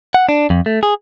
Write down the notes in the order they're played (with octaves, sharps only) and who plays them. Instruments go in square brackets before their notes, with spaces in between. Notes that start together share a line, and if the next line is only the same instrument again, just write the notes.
[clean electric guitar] F#5
D4
F2
A3
G#4